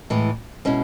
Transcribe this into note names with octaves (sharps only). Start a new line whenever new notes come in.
A2 E3 G#3
B2 G#3 C#4 E4